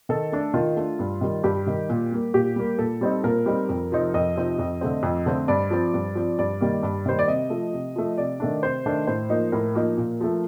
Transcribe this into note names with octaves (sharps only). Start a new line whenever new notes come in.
D#3 A4
A3 D4
D#3 F4
A3 D4
G2
D#3 G3
G2 G4
D#3 G3
A#2
G3 A#3
A#2 G4
G3 A#3
A#2 A4
G3 C4 D#4
A#2 A#4
G3 C4 D#4
F2
C3 F3 C4 D#4
F2 D#5
C3 F3 C4 D#4
F2
D3 A3 C4
F2
D3 A3 C4
G2 D5
F3 C4
G2
F3 C4
G2 D5
D#3 G3 A#3
G2
D#3 G3 A#3 C5
D5
C3 D#5
F3 A3
C3
F3 A3
C3 D5
D#3 A3 D4
C3 C5
D#3 A3 D4
A2 C5
F3 A#3 D#4
A2 A#4
F3 A#3 D#4
A#2
F3 A3